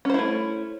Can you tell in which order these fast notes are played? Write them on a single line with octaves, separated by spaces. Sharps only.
C#4 C5 E4 A3